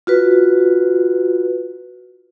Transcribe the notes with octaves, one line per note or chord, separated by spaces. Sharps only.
F4 F#4 B4